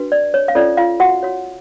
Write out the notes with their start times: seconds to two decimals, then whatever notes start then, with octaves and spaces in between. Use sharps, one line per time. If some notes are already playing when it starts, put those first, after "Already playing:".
Already playing: D4 F#4 B4
0.12 D5
0.34 C#5
0.48 F5
0.55 C#4 F4 A4 C#5 D5
0.77 F4 F5
1.00 F#4 F#5
1.23 F#4 C#5